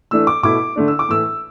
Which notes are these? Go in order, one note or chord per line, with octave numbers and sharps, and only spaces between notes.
E3 A3 D4 E6
D6
B2 A3 E4 D6
D3 A3 D4
E6
D6
A2 E3 A3 E6